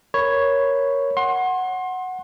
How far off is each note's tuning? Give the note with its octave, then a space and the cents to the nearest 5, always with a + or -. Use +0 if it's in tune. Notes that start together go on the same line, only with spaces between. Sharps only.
A#4 +10 C#5 +0 B5 +0
F#5 +0 C6 +30